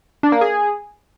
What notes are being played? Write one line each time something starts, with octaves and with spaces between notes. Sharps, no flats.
D4
A#3
G#4